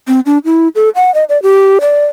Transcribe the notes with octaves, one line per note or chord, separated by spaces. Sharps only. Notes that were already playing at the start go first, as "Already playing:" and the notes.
C4
D4
E4
A4
F#5
D#5
D5
G4
D5